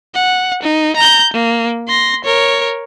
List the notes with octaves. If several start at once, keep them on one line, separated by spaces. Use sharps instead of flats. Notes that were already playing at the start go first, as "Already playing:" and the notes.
F#5
D#4
A#5 G6
A#3
C6 A#6
A#4 C#5